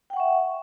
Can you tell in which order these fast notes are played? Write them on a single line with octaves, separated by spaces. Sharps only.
G5 F#5 C#6 E5